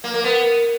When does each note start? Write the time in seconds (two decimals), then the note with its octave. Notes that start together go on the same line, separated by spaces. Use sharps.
0.04 A#3
0.14 A#3
0.24 B3